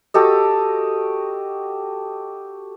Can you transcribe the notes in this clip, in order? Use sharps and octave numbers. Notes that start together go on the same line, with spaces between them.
F#4 G4 A4 D#5